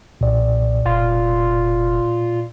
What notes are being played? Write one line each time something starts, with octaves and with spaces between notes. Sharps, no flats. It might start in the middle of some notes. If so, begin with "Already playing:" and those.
B1 A#2 D5
F1 F4